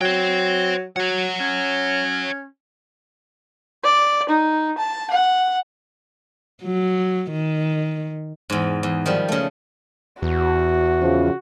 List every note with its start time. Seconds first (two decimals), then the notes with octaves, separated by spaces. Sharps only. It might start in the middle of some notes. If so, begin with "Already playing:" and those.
0.01 F#3 C5 G5
0.96 F#3 C#5 F#5
1.41 C#4
3.84 D5
4.29 D#4
4.77 A5
5.10 F#5
6.63 F#3
7.32 D#3
8.50 E2 G#2
8.83 E2
9.06 D#3 F3 G3
9.28 C#3 A3
10.22 E2 F#4
11.01 C#3 F3